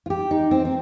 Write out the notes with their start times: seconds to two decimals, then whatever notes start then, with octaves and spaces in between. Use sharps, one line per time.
0.06 F4
0.10 G4
0.31 D#4
0.51 C4
0.65 C4